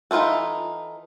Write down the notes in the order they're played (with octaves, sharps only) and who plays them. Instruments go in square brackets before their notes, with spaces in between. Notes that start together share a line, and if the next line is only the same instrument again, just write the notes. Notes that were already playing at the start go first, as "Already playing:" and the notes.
[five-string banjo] E3 D#4 F4 F#4 A4